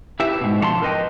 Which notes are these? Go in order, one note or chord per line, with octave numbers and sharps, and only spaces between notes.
E4 G4 B4 E5
G#2 B2
D3 F3 C#5 A5 C6
A#4 B4 D#5 G5